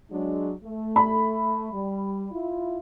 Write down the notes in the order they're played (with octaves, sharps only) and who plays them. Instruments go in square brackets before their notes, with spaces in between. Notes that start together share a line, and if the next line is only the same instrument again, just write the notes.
[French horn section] F#3 G#3 D4
A3
[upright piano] B5
[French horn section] G3
E4 F4